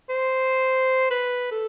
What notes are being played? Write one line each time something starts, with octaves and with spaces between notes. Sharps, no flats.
C5
B4
A4